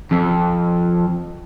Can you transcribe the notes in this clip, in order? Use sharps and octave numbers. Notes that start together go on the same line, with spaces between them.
F2